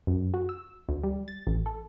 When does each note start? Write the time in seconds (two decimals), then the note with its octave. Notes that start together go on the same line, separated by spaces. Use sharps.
0.07 F#2
0.34 F#4
0.49 E6
0.89 D2
1.03 G3
1.28 A6
1.47 A1
1.66 A4